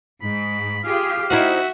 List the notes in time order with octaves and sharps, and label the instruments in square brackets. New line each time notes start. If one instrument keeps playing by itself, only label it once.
[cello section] G#2 [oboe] B5
[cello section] F4 G4 G#4 [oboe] F5
[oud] C4 D#4 E4 [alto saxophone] F#4 [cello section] E5